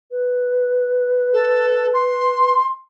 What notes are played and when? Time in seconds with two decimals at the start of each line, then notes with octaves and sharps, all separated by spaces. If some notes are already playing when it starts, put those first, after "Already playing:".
0.11 B4
1.33 A4
1.93 C6